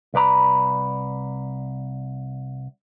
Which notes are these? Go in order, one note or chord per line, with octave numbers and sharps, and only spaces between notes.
C2 B4 D5 A#5 B5